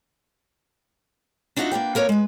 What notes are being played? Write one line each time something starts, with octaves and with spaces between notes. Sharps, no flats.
D4 D#4 F4 F#4 B4 E5
A#3 D4 B4 G5
A#3 A#4 B4 C#5
G#3 B4